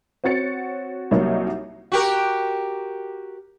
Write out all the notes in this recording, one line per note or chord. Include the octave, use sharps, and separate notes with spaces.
C4 F#4 C#5 A6 C#7
C2 F#3 G3 A#3 D#4 C#5
F#4 G4 A#4